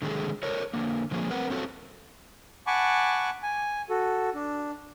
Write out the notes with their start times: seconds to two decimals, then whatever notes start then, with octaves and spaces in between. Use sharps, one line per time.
0.02 D3 D#3 F#3 G#3 G#4 A4
0.43 A4 A#4 C#5
0.73 D3 A#3
1.11 D3 F3 G#3 A#3
1.31 C4 A#4 B4 F#5
1.50 A3 C4 C#4 F4 F#4 A4
2.67 F#5 G#5 A5 B5 C#6 D6
3.43 G#5
3.90 F#4 A4
4.35 D4